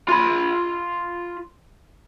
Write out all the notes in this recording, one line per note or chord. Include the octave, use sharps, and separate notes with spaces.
F4 B5